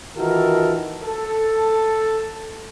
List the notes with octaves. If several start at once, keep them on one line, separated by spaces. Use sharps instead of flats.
D#3 E3 F4 F#4 A4 A#4
A4